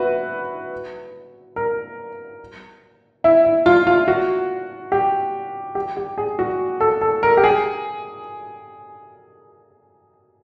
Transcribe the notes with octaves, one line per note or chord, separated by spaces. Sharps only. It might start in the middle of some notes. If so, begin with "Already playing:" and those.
Already playing: E4 F#4 B4
A#4
E4
E4
F4
F4
F#4
G4
G4
G4
G#4
F#4
A4
A4
A#4
G4
G#4